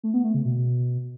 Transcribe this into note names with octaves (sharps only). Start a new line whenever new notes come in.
A3
B3
A3
C#3
B2